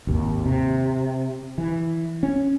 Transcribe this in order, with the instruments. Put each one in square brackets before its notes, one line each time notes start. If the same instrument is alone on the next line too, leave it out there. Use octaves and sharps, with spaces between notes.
[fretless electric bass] G#1 D#2
C3
E3
C#4